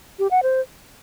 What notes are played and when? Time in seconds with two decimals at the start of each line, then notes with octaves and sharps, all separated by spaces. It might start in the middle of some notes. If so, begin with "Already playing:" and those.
0.19 G4
0.31 F#5
0.43 C5